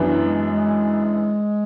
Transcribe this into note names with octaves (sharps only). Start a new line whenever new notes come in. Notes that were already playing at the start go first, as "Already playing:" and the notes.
Already playing: F#2 E3 B3 D4
G#3
G#3